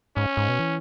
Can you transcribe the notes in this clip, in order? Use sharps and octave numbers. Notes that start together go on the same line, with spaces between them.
G#2 C#4
G#2
B2
E3